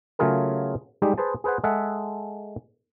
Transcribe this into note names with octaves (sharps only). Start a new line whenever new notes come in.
C#3 F#3 A3 F4 G#4 A#4
G3 G#3 D#4 G4
G#4 B4 C5 A5
G#4 B4 C5 F#5
G#3 G#4 A4 E5 F#5